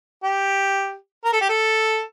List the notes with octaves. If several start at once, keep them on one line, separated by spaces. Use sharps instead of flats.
G4
A#4
A4
G4
A4